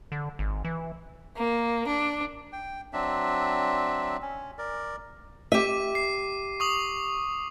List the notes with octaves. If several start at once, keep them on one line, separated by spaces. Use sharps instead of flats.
D3
G#1
E3
A#3
D4
G5
F#3 C4 D4 E5
C#4
A#4 D5
G4 E5 D6 D#7
C7
C#6 D#6 F#7